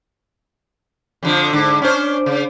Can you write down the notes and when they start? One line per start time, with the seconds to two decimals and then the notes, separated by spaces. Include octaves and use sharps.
1.23 F2 D3 F3
1.53 G#2 D3
1.82 C#4 D4 C5
2.26 C#3